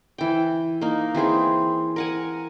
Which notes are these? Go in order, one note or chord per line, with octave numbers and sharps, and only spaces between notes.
E3 G5
A#3 D#4
E3 C4 G#4 C5
A#4 F#5 G#5